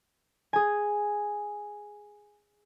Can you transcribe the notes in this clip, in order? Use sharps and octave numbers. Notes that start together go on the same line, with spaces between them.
G#4 G#5